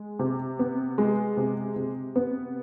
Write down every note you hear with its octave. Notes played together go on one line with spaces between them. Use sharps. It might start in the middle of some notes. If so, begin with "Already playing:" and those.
Already playing: G#3
C3
B3
G#3
C3
C3
B3